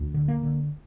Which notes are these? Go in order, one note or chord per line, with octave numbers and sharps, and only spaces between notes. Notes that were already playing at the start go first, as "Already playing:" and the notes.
Already playing: D2
D3
A#3
D3